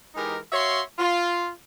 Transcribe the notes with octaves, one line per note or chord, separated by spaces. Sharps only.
E3 G#3 D#4 G4 A#4
F#4 C#5 E5 F5 C6
F4